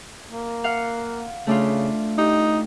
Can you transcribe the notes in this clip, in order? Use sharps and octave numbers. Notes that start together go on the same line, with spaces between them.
A#3
F5 F#5 F6
C#3 A3 D4 F4
D#4 G4